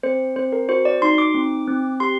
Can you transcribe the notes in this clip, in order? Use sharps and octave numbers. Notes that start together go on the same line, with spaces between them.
C4 C5
C4 C5
A#4
F#4 C5
D5
D#4 C6
D6
C4
C4
G4 C6